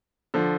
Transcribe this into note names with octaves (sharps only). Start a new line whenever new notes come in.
D3 F3